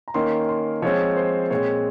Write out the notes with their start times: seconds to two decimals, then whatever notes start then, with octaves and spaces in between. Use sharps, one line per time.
0.08 A#5
0.14 D#3 A#3 C#4 C6
0.49 C6
0.82 F3 G#3 C4 C#5
1.17 C5
1.50 A#2 G#3 C4 C#5